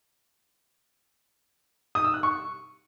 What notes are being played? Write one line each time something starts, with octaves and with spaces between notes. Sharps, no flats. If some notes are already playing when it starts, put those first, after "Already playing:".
D#6
E6
F#6
C#6